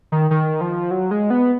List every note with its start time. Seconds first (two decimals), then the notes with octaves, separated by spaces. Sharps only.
0.12 D#3
0.31 D#3
0.61 F3
0.91 F#3
1.11 G#3
1.30 B3